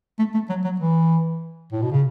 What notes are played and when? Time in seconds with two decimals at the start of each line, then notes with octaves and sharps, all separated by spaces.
0.19 A3
0.34 A3
0.49 F#3
0.64 F#3
0.80 E3
1.72 A2
1.82 B2
1.92 C#3